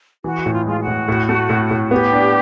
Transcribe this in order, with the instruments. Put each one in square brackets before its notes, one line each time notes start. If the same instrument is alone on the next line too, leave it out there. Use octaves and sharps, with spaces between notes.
[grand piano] E3 [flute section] F#4
[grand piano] A2
[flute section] F4
[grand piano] G#3 [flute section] F4
[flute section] F#4
[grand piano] A2
A2
A3
A2
A2
[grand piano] B3 [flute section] G4
[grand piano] D4